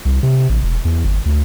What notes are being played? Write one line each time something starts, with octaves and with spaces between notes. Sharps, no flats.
C2
C3
A1
E1
E2
G1
D2